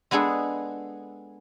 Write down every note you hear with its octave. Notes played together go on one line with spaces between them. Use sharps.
G#3 B3 D4 G#4 A4